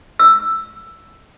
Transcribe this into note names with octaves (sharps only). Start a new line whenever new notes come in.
E6